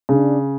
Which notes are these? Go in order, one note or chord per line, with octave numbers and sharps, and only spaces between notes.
C#3 D4